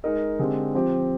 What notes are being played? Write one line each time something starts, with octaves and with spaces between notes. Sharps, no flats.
G#3 D#4 A#4 D#5
D3 G#3 C4 G4
F3 C4 G4